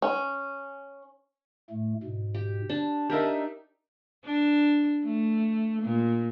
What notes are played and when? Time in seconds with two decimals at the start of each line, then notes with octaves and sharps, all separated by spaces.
0.02 C#4
1.70 A2 A3
2.03 G#2 B2
2.34 G4
2.70 D4 A5
3.10 D4 D#4 G4 A#4 E5
4.25 D4
5.05 A3
5.82 A#2